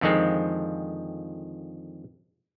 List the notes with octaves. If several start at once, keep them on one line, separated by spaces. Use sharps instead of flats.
F2 D3 D#3 F3 G#3 C4